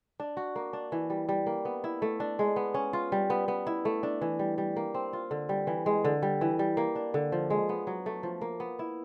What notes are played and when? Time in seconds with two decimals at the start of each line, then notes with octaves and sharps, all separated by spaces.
0.20 D4
0.37 F#4
0.56 A#3
0.73 D4
0.92 E3
1.10 G3
1.29 G3
1.46 A#3
1.65 B3
1.84 E4
2.02 A3
2.20 D4
2.39 G#3
2.56 B3
2.74 C#4
2.93 F4
3.12 G3
3.30 B3
3.48 B3
3.67 E4
3.85 A3
4.03 D4
4.21 E3
4.39 G3
4.58 G3
4.76 A#3
4.94 C4
5.13 F4
5.31 D3
5.49 G3
5.67 E3
5.86 G#3
6.04 D3
6.22 G3
6.41 E3
6.59 G3
6.77 A#3
6.95 D4
7.14 D3
7.32 F3
7.50 G#3
7.69 B3
7.87 F#3
8.06 A3
8.23 F3
8.41 A#3
8.60 B3
8.79 E4